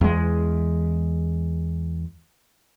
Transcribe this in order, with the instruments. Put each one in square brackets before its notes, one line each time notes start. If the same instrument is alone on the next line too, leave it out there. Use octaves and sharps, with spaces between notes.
[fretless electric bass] E2 G#3